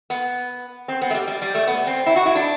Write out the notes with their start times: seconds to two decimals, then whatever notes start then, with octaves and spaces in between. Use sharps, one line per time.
0.10 B3
0.88 C4
1.01 B3
1.10 A3
1.14 G3
1.28 G3
1.42 G3
1.54 A3
1.67 B3
1.87 C4
2.06 E4
2.16 F#4
2.26 E4
2.35 D4